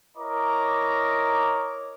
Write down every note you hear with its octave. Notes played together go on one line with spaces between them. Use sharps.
E4 A#4 C#5 D#5 A#5 D6